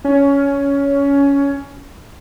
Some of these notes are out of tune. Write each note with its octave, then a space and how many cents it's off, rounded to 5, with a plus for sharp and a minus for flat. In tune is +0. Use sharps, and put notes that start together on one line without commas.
C#4 +15